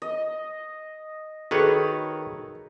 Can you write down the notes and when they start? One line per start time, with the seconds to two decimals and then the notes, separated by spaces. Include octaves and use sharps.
0.02 D#5
1.51 D#3 F#4 G#4 A4 B4 C#5